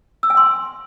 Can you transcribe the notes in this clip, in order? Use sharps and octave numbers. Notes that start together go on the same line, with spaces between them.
E6
G#5
C6